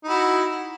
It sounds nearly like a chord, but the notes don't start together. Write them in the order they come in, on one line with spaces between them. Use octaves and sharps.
D#4 E4 F#4